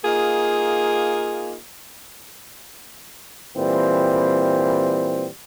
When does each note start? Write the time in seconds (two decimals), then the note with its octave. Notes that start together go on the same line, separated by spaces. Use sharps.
0.05 A#3 D#4 F4 G#4
3.56 A#2 E3 G3 C4